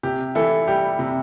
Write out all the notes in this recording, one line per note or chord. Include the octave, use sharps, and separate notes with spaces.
C3 G4
E3 E4 A4
G3 G4
C3